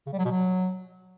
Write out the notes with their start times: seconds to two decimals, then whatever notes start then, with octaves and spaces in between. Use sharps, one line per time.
0.07 C#3
0.13 G3
0.19 F#3
0.25 B2
0.31 F#3